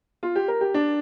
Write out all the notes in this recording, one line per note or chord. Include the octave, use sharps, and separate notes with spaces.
F4
G4
A#4
G4
D4